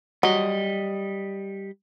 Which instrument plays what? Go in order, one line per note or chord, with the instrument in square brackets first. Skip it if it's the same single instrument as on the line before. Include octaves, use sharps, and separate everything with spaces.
[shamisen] F#3 [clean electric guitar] G3 D#5